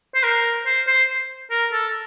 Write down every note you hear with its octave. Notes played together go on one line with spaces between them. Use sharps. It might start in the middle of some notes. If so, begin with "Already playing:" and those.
C5
A#4
C5
C5
A#4
A4